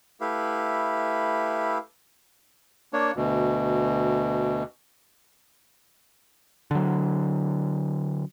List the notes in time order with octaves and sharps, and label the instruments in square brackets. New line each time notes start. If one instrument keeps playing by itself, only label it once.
[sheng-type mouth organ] A3 E4 G4 B4 F5
[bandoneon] A#3 D4 C#5
D2 B2
[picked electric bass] D3 F#3